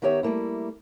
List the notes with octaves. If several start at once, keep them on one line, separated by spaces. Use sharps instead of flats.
D#3 B3 D#4 G4 C#5 E5
G3 A3 A#3 E4